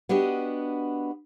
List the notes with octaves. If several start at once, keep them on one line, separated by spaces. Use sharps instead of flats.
B3 D4 F#4 G4 D#5